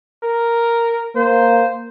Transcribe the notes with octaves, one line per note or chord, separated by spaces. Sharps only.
A#4
A#3 C5